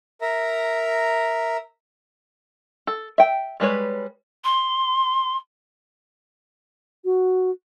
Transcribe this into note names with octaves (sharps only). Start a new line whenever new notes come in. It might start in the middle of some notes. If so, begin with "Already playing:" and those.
A#4 E5 A#5
A4
E5 G5
G3 G#3 B4 C#5
C6
F#4